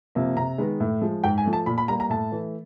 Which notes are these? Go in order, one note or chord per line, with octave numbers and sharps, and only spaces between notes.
C3 F3 A#3
C3 A#5
D#3 G#3 B3
A2
F3 G#3
G#2 G5
G#5
F3 A3
A5
A#2 B5
B5
G3 A#3 A#5
A#5
A2 A5
E3 A3